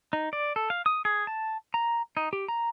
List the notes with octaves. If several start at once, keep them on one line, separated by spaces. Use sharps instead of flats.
D#4
D5
A4
F5
D#6
G#4
A5
A#5
D#4
G4
A#5